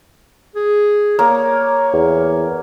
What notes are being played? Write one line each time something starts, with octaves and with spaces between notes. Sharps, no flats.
G#4
A#3 C#5
E2